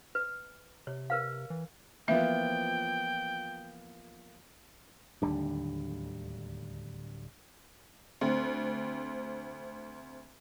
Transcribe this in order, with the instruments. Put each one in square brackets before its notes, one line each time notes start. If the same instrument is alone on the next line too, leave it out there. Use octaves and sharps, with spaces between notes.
[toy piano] B4
[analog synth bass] C3 [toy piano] C#5
[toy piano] A#4 B4 F5
[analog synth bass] E3
[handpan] E3 F3 [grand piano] A#3 B3 F4 [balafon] E5 [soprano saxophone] G5
[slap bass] D1 D3 G3 [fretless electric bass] D#2 D4
[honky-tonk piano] D2 C4